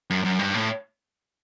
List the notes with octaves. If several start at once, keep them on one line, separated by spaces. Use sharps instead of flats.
F#2
F#2
G2
A2